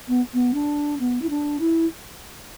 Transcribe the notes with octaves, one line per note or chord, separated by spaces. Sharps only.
B3
B3
D4
B3
E4
D4
E4